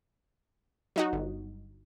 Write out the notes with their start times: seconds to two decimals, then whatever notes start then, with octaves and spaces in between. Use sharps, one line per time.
0.96 F#3 D#4 F#4
1.13 G1